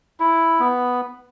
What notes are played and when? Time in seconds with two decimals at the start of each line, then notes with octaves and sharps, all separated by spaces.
0.20 E4
0.60 B3